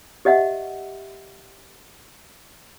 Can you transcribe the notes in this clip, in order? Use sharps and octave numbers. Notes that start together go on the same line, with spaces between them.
G4 D#5 E5 F#5